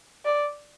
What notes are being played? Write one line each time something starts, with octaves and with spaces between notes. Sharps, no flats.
D5